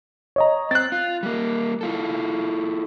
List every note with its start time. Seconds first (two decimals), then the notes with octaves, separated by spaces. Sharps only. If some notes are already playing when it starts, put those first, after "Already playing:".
0.36 C#5 D#5 A#5
0.71 C4 F#6 A6
0.92 F4
1.23 G3 A#3
1.81 E4 F4 A4